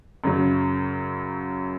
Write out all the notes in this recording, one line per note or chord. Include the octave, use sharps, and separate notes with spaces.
F#2 C#3 F#3